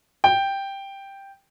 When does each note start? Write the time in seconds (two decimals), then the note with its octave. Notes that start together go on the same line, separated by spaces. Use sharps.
0.24 G5